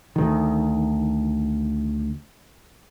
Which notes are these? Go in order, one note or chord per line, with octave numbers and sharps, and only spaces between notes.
D2 D#3